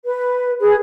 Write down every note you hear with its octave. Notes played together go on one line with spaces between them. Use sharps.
B4
G#4 B4